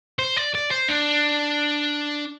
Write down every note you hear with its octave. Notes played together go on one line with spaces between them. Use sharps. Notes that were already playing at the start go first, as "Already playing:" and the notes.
C5
D5
D5
C5
D4